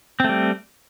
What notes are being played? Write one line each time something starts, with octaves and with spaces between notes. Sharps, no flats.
G3 A3 C4